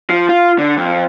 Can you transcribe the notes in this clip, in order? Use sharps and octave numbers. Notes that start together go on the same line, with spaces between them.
F3
F4
D3
F2